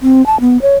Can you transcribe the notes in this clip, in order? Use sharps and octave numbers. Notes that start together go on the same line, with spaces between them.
C4
A5
B3
C#5